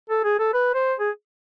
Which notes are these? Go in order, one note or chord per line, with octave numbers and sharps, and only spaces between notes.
A4
G#4
A4
B4
C5
G#4